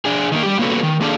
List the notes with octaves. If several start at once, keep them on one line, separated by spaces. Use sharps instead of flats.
D4 G#4
D#3 A3 A#3
G3 G4
A#3 B3 C#4 F#4 A4
D#3
A#3 D4 G#4 A4 D5 F5